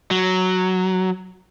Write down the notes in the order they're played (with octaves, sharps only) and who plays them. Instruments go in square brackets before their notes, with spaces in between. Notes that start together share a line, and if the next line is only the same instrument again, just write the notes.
[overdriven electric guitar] F#3